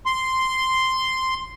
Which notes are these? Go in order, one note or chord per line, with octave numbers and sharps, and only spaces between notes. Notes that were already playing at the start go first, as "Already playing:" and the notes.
C6